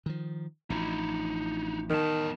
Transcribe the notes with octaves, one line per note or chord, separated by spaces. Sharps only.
D#3 F3
A1 F3 D#4 E4
E2 D#3 A5